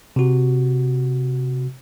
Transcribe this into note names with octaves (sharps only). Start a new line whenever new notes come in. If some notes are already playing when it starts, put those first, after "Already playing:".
C3 F#4